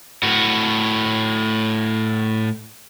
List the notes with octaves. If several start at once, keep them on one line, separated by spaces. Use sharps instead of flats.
A2 F#4